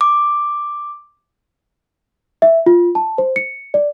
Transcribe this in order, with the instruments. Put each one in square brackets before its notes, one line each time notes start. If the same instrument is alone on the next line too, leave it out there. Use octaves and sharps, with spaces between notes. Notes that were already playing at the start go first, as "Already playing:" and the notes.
[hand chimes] D6
[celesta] E5
F4
A5
C5
C#7
D5